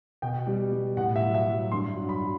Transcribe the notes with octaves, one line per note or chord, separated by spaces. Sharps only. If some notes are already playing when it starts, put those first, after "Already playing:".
B2 G5
G3
G3
A2 F#5
E5
F#3
E5
F#3
G2 C6
F#3
B5
F#3